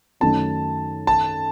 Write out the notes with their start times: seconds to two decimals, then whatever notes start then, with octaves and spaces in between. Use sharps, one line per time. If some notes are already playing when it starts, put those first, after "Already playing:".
0.20 F#2 D#3 A3 D#4 A5
1.07 A5